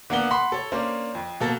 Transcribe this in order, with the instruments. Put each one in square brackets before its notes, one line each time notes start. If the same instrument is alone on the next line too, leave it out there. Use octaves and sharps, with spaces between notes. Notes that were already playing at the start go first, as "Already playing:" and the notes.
[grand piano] D3 A#3 B3 G7
F#5 B5 C6
A4 C#5
A#3 C#4 D4 C5
F2
B2 A#3 A4